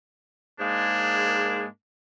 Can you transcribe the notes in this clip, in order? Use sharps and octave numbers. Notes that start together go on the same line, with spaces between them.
G#2 G#3 A#3 D4